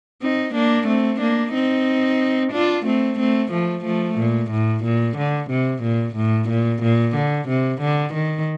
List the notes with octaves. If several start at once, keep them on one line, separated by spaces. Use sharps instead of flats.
C4 D#4
A#3 D4
A3 C4
A#3 D4
C4 D#4
D4 F4
A3 C4
A3 C4
F3 A3
F3 A3
A#2
A2
A#2
D3
C3
A#2
A2
A#2
A#2
D3
C3
D3
D#3